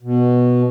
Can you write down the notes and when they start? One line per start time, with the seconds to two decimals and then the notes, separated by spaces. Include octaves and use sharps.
0.01 B2